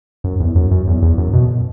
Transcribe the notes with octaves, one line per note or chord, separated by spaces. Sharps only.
F#2
E2
F#2
F#2
E2
E2
F#2
B2